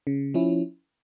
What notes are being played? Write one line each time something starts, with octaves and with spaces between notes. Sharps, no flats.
C#3
F3 C#4 E4